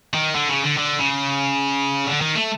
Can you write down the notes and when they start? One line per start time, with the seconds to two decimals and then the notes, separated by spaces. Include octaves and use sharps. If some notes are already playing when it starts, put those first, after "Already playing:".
0.13 D#3
0.35 D3
0.49 C#3
0.64 D3
0.77 D3
0.99 C#3
2.07 D3
2.21 D#3
2.35 A3